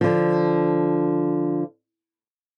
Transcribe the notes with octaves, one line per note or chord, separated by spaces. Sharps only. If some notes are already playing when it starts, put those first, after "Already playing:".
D3 F3